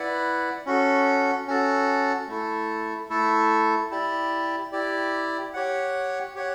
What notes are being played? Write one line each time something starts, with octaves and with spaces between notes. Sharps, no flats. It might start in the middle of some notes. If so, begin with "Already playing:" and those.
Already playing: E4 B4 D5 F#5
C#4 F#4 A4
C#4 F#4 A4
A3 E4 A4
A3 E4 A4
E4 G4 D5
E4 G4 D5
G4 C#5 F#5
G4 C#5 F#5